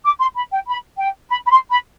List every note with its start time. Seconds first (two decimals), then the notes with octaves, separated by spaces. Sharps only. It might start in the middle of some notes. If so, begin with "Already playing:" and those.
0.05 D6
0.20 C6
0.36 B5
0.51 G5
0.67 B5
0.98 G5
1.29 B5
1.45 B5
1.50 C6
1.70 B5